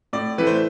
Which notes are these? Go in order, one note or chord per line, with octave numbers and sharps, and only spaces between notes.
A2 D5
E3 A3 B4
C5